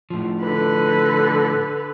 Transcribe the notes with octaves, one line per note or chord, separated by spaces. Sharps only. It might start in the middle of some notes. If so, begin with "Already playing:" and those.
A2 F3
D3 B4